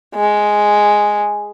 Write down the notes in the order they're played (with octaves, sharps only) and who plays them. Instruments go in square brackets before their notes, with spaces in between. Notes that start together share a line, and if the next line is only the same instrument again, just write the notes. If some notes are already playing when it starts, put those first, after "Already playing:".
[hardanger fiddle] G#3